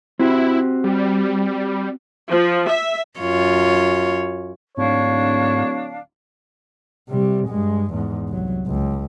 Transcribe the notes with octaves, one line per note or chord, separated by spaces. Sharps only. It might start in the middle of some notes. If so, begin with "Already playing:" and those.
C4 E4 F#4 G4
G3
F3
E5
F#2 F4 C#5
D1 G#2 D4 C#5 F5
C3 G3
G2 G#3
E2 G#2
C2 F#3
C#2